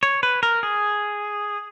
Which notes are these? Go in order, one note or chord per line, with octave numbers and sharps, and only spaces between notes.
C#5
B4
A#4
G#4